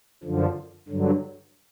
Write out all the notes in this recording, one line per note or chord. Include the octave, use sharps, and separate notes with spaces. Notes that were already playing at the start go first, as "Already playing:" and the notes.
F#2 D3 F3
G2 D3 F#3